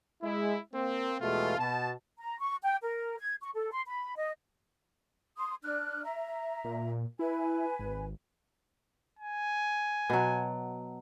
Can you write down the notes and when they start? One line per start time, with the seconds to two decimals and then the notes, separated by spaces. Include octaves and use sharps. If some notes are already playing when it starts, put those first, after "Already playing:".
0.22 G#3 E4
0.74 A#3 C4
1.21 E2 B2 G#3 A3 F4
1.59 B2 A5
2.18 A#5
2.39 C#6
2.63 G5
2.82 A#4
3.19 G#6
3.42 C#6
3.54 A4
3.71 C6
3.86 B5
4.16 D#5
5.37 C6 D#6
5.62 D4 F6 F#6
6.03 E5 A#5
6.64 A#2
7.19 E4 B4 G#5
7.79 G#1
9.19 G#5
10.10 B2 F#3